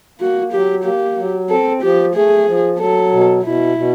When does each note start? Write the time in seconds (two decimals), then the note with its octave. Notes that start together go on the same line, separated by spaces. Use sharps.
0.19 A#3 F#4
0.52 F#3 G4
0.84 A#3 G4
1.17 F#3
1.50 C4 A4
1.82 F3 G4
2.15 A3 G#4
2.47 F3
2.79 F#3 A4
3.12 B2
3.44 B2 E4
3.77 B2